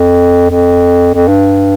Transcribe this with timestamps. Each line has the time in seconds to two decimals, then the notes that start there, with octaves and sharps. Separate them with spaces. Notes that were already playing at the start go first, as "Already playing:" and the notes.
Already playing: F2
0.50 F2
1.14 F2
1.28 G2